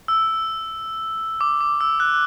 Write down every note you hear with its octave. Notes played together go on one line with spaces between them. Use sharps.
E6
D6
D6
E6
F#6